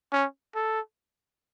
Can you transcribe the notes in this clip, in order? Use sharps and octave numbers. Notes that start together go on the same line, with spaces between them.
C#4
A4